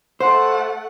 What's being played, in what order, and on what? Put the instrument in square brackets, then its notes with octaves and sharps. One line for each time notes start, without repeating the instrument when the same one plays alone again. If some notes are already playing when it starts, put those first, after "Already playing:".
[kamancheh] A3 F#5 [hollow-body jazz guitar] C5